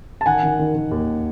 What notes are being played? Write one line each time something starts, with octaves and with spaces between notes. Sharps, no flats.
A5
D#3 F#5 G#5
D#3
D#3
D#3
D#2